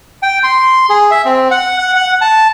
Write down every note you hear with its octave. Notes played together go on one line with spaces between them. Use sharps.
G5
C6
G#4
E5
C4
F#5
F#5
F#5
A5